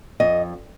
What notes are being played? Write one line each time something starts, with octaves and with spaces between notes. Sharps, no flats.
F2 D#5